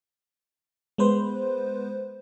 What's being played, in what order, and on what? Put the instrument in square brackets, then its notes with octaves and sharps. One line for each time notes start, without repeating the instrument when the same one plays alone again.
[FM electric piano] G#3 B3 B4 C5